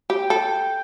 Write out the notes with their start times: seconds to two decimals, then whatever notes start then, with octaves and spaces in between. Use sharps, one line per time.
0.10 G4 G5
0.30 A4